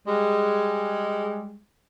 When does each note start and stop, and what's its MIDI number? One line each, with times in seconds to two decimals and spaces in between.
0.06 1.59 55
0.06 1.59 56